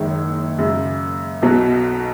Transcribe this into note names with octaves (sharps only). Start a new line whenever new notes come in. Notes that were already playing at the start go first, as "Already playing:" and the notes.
Already playing: F#1 F#2 D#3 G#3 C#5
F#2 C#3 G#3
B1 B2 F#3